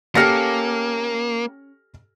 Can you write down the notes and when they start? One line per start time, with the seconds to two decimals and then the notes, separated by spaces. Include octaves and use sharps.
0.15 A#3 C#4 G4 A4 F6 A#6 C#7